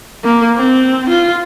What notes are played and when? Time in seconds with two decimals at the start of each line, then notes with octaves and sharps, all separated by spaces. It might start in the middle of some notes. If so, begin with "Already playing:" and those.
0.24 A#3
0.56 C4
1.09 F4